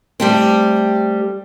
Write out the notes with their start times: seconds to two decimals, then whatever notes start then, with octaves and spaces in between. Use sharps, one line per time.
0.20 G3 A3 C4